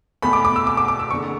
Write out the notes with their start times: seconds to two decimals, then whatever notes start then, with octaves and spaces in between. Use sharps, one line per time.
0.22 E2 B2 A3 B5
0.33 D6
0.45 D6
0.56 E6
0.67 D6
0.77 D6
0.88 D6
0.99 E6
1.11 F#1 E2 D3 C#6